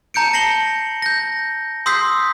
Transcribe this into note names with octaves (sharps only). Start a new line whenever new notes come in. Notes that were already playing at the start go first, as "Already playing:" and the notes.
A5 A#5 G6 C#7 D7
A5 A#6 C7 C#7 F#7 G7
G6 A#6
C6 D#6 E6 G6 B6 C7